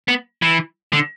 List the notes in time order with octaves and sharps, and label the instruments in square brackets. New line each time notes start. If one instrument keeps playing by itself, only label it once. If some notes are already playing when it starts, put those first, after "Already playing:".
[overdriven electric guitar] B3
E3
D3